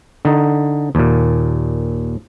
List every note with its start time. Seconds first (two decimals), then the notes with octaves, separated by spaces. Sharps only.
0.25 D3 D#4
0.95 D#2 A#2